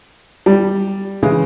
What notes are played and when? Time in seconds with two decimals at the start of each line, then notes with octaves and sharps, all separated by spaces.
0.46 G3
1.23 C#3 E3 G#3